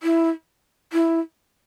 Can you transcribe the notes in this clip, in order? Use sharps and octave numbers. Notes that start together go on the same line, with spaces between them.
E4
E4